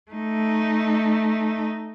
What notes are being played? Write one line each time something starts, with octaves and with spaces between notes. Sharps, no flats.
A3 D#4